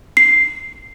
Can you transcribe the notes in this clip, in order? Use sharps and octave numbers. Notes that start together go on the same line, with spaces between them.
C7